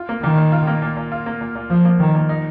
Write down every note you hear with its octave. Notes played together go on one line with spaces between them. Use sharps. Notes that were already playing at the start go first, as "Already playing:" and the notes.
Already playing: F4
A#3
A#2 D#3
A#2
F4
A#3
A#2
A#2
F4
A#3
A#2
A#2
F3 F4
A#3
A#2 D#3
A#2
D#4